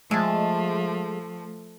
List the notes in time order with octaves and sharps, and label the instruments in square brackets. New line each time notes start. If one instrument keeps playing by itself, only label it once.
[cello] F3 [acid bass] G#3 [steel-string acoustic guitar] A3 [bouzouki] E5 A5